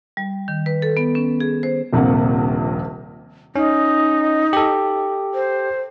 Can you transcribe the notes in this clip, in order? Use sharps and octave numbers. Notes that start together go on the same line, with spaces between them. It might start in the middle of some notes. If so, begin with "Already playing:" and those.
G3
D#3
B4
A4
B3
C#4
G#4
C5
D#1 A#1 C3 A#3 F#5
C#4 D#4
G4 A4
C5